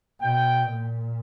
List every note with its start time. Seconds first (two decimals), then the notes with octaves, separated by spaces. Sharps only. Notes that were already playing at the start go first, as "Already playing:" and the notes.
0.20 B2 G5
0.69 A#2